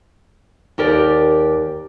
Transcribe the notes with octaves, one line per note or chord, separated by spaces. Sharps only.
D#2 G4 A#4 D5